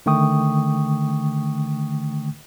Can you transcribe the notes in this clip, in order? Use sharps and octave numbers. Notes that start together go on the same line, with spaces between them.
D3 D#3 A3 G5 C#6 D#6